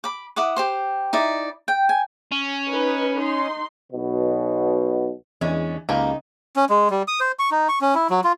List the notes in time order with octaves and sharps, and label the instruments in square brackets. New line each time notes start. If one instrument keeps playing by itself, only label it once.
[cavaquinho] B5 D6
E4 F#5 D6 D#6
G4 C5 C6
D#4 E4 D5
G5
G#5
[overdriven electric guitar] C#4
[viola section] D#4 B4
D#4 C6
[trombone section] B1 B2
[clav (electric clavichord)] E2 G#5 [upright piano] E3 D4 [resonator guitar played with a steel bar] G#3 C#4
[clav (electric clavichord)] C#2 B4 [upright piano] C#3 [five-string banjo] A#3 G4 [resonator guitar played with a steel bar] D#4
[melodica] C#4
G#3
G3
D#6
C5
C#6
D#4
C#6
C#4
E4
F#3
F4